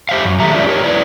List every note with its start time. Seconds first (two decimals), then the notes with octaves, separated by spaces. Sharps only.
0.09 G4 C5 E5 F5
0.25 F#2
0.40 D#3 A3 G4 E5 A#5
0.54 C#4 F4 G4 A#4 D5 E5
0.67 G4 A#4 C#5
0.84 F#3 E4 B4 D5